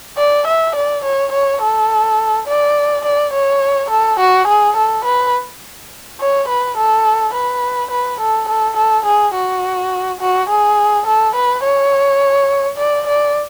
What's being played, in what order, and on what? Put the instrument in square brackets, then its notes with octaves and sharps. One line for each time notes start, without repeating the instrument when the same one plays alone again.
[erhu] D5
E5
D5
C#5
C#5
A4
D5
D5
C#5
A4
F#4
G#4
A4
B4
C#5
B4
A4
B4
B4
A4
A4
A4
G#4
F#4
F#4
G#4
A4
B4
C#5
D5
D5